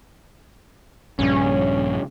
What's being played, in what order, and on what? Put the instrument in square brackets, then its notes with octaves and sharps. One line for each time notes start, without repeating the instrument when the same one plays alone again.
[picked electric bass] A#1 G2 C#3 [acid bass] C#4